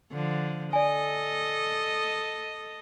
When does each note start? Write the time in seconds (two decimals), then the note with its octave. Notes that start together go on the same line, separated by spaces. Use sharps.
0.12 D3 F3
0.73 A4 D5 D#5 G#5